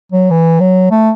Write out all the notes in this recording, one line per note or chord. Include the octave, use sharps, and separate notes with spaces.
F#3
E3
F#3
A3